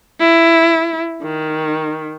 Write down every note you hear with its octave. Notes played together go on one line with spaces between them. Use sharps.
E4
D#3